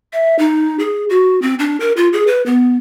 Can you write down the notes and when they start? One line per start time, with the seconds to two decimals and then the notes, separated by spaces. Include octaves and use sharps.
0.13 E5
0.39 D#4
0.79 G#4
1.10 F#4
1.42 C4
1.59 D4
1.80 A#4
1.97 F4
2.13 G#4
2.27 B4
2.46 B3